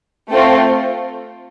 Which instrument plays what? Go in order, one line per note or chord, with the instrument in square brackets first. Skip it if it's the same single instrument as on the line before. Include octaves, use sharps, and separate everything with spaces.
[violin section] A3 C4 F4